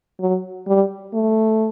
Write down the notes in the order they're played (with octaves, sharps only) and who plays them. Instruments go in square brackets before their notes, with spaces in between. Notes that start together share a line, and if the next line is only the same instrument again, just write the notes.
[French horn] F#3
G3
A3